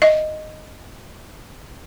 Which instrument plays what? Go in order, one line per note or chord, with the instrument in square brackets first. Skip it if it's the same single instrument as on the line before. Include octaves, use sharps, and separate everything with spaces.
[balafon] D#5 E5